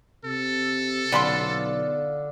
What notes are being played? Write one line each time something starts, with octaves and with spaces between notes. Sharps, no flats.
C3 A4
B1 D3 C#4 F4 B5 C6